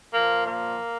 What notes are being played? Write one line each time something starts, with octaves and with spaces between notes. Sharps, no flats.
A#2 F3 A#3
A#3